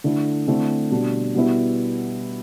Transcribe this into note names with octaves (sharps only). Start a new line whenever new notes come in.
D3 A3 E4
D3 A3 C4 E4
B2 G3 D4
B2 G3 B3 E4